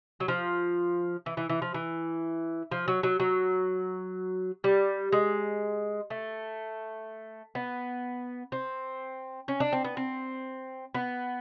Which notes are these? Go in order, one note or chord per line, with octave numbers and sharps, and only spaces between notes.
F#3
F3
E3
E3
E3
F3
E3
F3
F#3
F#3
F#3
G3
G#3
A3
B3
C4
C#4
D4
C4
B3
C4
B3